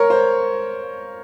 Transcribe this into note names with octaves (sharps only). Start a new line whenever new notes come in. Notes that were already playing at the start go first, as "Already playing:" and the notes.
Already playing: A#4 C#5
C5